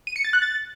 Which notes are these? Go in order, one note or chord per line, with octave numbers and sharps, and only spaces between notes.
D#7
C#7
A6
F#6
A6